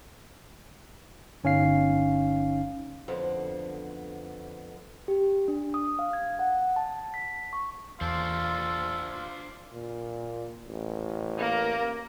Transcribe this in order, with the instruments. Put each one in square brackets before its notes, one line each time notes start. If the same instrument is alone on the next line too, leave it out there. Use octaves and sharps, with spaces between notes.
[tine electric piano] G1 C#4 D#4 F5 C7
[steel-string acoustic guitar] F2 D3 B3 C5
[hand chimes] G4
D4
D#6
F5
G#6
F#5
A5
B6
C#6
[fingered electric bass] E2 [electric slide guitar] D4 C5 [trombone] F4 [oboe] A4
[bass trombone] A#2
A1
[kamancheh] A#3 A#4